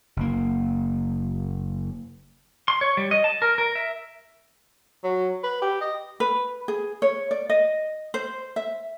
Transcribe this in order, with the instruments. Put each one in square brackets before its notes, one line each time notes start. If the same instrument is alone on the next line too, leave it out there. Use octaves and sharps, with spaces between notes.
[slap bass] F#1 A#3
[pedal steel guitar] C6
C#5
G3
D#5
A5
A#4
A#4
E5
[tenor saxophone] F#3
B4
G4
D#5
[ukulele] B4
G#4
C#5
D5
D#5
C5
E5